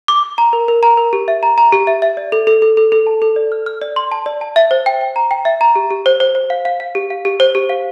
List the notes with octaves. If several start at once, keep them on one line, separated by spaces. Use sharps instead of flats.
D6
D6
A#5
A#4
A#4
A#5
A#4
G4
E5
A#5
A#5
G4
E5
E5
D5
A4
A4
A4
A4
A4
A5
A4
D5
F6
F6
D5
C6
A5
D5
A5
E5
C5
G5
G5
A#5
G5
E5
A#5
G4
G4
C5
C5
C5
F5
F5
F5
G4
F5
G4
C5
G4
F5